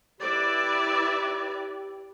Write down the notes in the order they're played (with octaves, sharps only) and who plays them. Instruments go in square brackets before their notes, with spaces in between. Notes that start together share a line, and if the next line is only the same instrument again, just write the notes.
[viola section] E4 B4 D5 [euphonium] G4